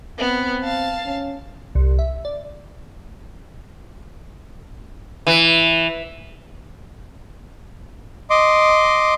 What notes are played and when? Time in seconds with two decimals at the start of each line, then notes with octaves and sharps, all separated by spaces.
0.18 B3 C4
0.64 F5 A5
1.06 C#4
1.75 C2
1.99 E5
2.25 D5
5.27 E3
8.30 D#5 C6 D6